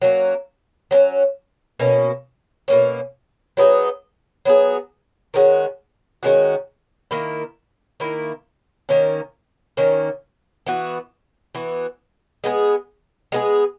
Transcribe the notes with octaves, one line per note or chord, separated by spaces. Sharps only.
F#3 A#3 C#4
F#3 A#3 C#4
B2 A#3 C#4
B2 A#3 C#4
F#3 B3 D#4 G#4
F#3 B3 D#4 G#4
D#3 G#3 C#4 F#4
D#3 G#3 C#4 F#4
D#3 A#3 E4
D#3 A#3 E4
D#3 A#3 C#4
D#3 A#3 C#4
E3 B3 F#4
E3 B3 F#4
G#3 B3 E4 G#4
G#3 B3 E4 G#4